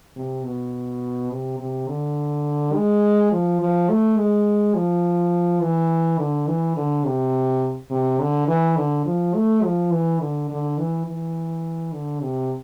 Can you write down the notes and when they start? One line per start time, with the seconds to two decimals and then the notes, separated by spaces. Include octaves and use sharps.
0.16 C3
0.44 B2
1.31 C3
1.60 C3
1.88 D3
2.75 G#3
3.32 F3
3.61 F3
3.90 A3
4.17 G#3
4.75 F3
5.62 E3
6.19 D3
6.47 E3
6.76 D3
7.06 C3
7.91 C3
8.20 D3
8.48 E3
8.77 D3
9.06 F3
9.35 A3
9.64 F3
9.92 E3
10.20 D3
10.50 D3
10.78 E3
11.07 E3
11.93 D3
12.21 C3